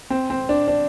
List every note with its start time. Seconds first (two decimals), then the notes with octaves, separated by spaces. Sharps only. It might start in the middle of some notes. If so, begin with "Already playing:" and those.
0.10 C4
0.30 C4
0.49 D4
0.68 D4